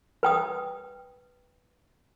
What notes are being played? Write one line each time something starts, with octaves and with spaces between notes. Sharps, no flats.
B4 G5 D#6